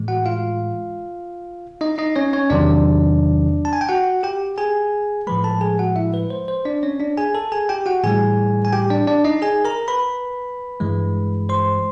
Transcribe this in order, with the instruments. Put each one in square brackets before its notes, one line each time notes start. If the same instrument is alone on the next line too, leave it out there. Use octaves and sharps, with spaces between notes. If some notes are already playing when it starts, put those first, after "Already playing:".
Already playing: [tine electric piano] A2 E3 G#3
F#4 F#5
F4 F5
D#4 D#5
D#4 D#5
C#4 C#5
C#4 C#5
E2 C3 D#3 F#3 D4 D5
A5
G#5
G5
F#4 F#5
G4 G5
G#4 G#5
A2 F3 G#3 B4 B5
A4 A5
G#4 G#5
F#4 F#5
E4 E5
B4
C5
C5
D4 D5
C#4 C#5
D4 D5
G#4 G#5
A4 A5
G#4 G#5
G4 G5
F#4 F#5
A2 E3 G3 G#4 G#5
G#5
G4 G5
D4 D5
D4 D5
D#4 D#5
G#4 G#5
A#4 A#5
B4 B5
G2 E3 G#3
C5 C6